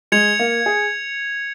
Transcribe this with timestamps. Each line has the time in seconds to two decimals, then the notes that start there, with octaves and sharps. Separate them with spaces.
0.12 G#3 G#6 C#7 F7
0.39 A#3
0.66 G#4